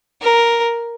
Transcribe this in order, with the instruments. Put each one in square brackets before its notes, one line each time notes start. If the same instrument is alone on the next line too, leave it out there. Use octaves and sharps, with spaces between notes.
[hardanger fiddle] A#4